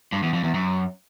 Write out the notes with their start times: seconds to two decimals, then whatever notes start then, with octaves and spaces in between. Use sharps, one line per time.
0.12 G2
0.23 E2
0.33 F2
0.44 E2
0.54 F#2